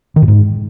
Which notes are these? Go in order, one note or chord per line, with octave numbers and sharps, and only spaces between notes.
D#3
A2
G#2